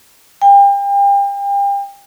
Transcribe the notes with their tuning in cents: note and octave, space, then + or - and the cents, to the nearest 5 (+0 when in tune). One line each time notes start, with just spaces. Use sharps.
G5 +35